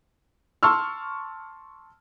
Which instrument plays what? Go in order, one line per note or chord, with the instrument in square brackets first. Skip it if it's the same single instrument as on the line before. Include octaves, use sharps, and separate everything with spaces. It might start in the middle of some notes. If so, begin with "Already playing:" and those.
[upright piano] A5 C6 C#6 E6 F6